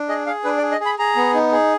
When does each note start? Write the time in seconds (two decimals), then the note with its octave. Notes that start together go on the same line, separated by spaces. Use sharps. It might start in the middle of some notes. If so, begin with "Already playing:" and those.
Already playing: D4
0.09 G#4 D#5
0.27 G#4 F5
0.44 D4 B4
0.58 D5
0.62 G#4
0.72 D#5
0.80 G#4
0.86 B5
0.99 G#4 A#5
1.16 B3
1.34 D#4
1.52 G#4